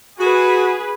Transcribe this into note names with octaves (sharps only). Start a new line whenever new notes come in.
F#4 G#4 B4